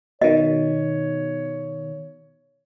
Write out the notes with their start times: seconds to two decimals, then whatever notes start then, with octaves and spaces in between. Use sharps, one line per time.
0.22 B2 D#3 C#5 D#5